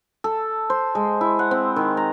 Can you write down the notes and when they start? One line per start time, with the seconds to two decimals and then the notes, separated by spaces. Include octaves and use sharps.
0.24 A4
0.70 C5
0.95 G#3
1.21 E4
1.39 F#5
1.51 C4
1.76 D#3
1.97 A#5